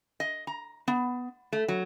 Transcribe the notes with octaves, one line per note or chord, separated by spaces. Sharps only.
D#5
A#5
B3
A3
F#3